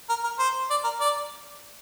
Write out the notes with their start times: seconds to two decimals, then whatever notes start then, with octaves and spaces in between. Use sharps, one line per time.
0.09 A#4
0.24 A#4
0.39 C5
0.70 D5
0.84 A#4
1.00 D5